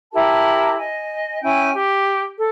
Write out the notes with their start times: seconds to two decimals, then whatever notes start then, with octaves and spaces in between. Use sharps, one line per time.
0.12 E4 G4 A#4 A5
0.77 D#5 G#5
1.41 C#4 E4 G5 G#5
1.73 G4
2.37 A4